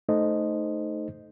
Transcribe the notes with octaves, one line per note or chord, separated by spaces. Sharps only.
A3 D#4 A4 C5 D#5